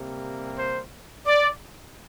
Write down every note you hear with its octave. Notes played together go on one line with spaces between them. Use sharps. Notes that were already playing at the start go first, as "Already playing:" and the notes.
Already playing: C3 G3 A#3
C5
D5